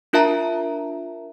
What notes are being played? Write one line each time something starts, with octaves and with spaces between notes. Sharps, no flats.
D4 F4 A#4 E5 A5 A#5